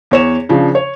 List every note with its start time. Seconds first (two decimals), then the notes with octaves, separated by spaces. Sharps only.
0.11 E2 C#5 E7
0.49 C#3 F3 D4
0.75 C#5